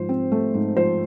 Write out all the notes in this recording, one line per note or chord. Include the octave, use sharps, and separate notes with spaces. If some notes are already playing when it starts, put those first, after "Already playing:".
Already playing: G#2 F3 C5
C4
A3
G#2
F3 C5